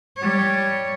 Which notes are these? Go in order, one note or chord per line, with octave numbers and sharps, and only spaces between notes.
G3 C#5